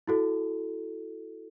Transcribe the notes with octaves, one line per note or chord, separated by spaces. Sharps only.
E4 F#4 A4